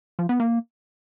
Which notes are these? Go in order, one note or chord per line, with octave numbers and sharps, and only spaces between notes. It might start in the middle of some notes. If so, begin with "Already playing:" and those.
F3
B3
A#3